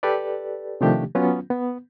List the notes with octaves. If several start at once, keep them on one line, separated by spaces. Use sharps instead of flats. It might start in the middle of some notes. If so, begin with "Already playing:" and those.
G4 A4 B4 D5
C3 D#3 F3 A3 D4 G4
F#3 B3 C#4 F4
B3